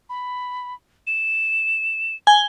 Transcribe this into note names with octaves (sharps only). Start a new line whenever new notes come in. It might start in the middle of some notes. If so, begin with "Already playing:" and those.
B5
E7
G#5 G7